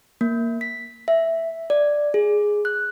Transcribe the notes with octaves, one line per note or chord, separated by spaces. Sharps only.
A#3
B6
E5
D5
G#4
F#6